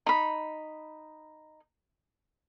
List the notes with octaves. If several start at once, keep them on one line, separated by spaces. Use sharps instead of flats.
D#4 B5